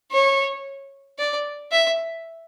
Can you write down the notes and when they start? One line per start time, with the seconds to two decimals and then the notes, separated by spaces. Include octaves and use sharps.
0.11 C#5
1.18 D5
1.72 E5